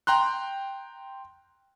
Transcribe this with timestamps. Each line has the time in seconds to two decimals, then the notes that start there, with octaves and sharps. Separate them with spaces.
0.07 G5 A#5 C6 F#6